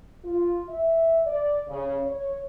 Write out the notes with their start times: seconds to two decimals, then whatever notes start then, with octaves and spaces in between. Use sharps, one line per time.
0.25 F4
0.68 E5
1.26 D5
1.68 C#3
2.07 C#5